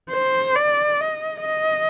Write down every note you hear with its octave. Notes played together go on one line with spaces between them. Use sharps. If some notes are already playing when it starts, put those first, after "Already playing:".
C5
D5
D#5
D#5